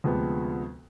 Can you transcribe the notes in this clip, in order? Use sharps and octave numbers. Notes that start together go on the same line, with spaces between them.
D2 C3 F3 G#3 B3